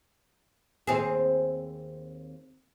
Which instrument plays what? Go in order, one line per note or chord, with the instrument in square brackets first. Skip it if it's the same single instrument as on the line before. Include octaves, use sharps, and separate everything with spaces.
[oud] D#2 C4 G#4